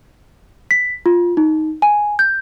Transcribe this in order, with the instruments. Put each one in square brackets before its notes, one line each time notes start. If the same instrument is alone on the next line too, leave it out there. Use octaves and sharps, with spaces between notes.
[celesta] B6
F4
D#4
G#5
G6